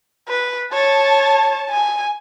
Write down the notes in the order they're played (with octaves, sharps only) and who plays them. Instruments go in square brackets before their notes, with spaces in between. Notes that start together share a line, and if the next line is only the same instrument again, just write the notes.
[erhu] B4
[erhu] C#5 [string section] A5
[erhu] G#5